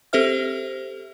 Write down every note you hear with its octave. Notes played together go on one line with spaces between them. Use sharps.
C4 G4 A4 C5 E5 F6